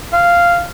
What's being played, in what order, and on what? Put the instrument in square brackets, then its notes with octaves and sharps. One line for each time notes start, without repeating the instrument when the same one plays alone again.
[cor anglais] F5